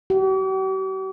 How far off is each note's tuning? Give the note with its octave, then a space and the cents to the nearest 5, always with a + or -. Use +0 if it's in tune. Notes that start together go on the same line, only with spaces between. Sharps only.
G4 -45